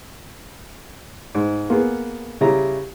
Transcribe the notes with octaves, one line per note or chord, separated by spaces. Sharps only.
G#2
A#3 B3 G#4
C#3 G3 E4 A#5